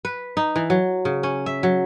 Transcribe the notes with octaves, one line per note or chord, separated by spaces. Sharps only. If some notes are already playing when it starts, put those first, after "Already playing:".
B4
D#4
E3
F#3
C#3
C#4
E5
F#3